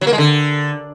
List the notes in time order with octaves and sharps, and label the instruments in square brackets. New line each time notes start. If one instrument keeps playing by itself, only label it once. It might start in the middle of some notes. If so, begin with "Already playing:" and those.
[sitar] F#3
A#3
G#3
D3